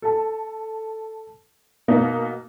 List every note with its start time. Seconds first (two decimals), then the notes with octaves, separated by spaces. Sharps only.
0.02 A4 A5
1.88 B2 A#3 B3 D#4